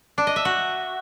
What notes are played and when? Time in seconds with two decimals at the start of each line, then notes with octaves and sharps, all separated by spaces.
0.18 D4
0.27 D#5
0.36 E5
0.45 F#4